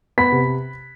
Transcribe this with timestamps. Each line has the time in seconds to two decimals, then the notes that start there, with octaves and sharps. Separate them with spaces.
0.18 B3 B5 B6
0.32 C3